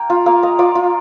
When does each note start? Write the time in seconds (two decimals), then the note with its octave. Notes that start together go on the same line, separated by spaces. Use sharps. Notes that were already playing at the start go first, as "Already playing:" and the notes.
Already playing: A#3 F5 G5
0.10 F4
0.26 A#3 F5
0.43 A#3 D#5
0.59 F4 D5
0.75 F4